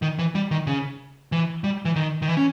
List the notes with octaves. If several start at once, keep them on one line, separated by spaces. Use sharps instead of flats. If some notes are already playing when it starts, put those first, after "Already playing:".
D#3
E3
G3
D#3
C#3
E3
G3
E3
D#3
D#3
E3
C#4